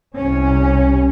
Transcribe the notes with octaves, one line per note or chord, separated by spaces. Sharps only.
C2 C#4